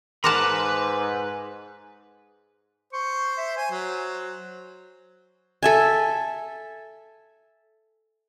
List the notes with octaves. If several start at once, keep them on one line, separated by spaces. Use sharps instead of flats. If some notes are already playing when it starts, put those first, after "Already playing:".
G#2 A#4 B4 F#5 A5 B5 C6 D6
C5 C#6
E5
C5 G#5
F#3
A4 E5 G#5